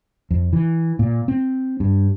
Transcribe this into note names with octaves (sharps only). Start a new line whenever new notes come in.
F2
E3
A#2
C4
G2